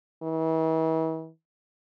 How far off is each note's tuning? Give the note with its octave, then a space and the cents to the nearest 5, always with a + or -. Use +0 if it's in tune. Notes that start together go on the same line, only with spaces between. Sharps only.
E3 -40